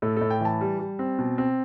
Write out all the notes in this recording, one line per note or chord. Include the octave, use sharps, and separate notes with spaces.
A2 A4
A2 A4
G5
E3 A5
G3
G3
C4
B2
C4